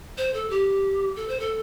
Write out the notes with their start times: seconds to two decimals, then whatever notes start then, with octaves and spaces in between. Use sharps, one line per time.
0.18 C5
0.34 A4
0.50 G4
1.16 A4
1.29 C5
1.40 A4